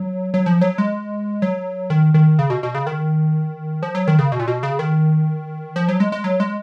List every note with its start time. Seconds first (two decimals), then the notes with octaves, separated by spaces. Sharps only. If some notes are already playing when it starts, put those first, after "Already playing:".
Already playing: F#3
0.34 F#3
0.46 F3
0.61 F#3
0.78 G#3
1.42 F#3
1.90 D#3
2.14 D#3
2.39 C#3
2.50 B2
2.63 B2
2.75 C#3
2.87 D#3
3.83 F3
3.95 F#3
4.07 D#3
4.19 C#3
4.32 B2
4.39 A#2
4.48 B2
4.63 C#3
4.79 D#3
5.76 F3
5.89 F#3
6.00 G#3
6.12 G#3
6.24 F#3
6.40 G#3